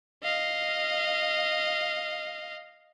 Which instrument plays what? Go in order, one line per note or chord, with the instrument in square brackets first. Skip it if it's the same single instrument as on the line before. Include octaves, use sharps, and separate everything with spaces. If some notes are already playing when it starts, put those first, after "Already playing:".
[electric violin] D#5 F5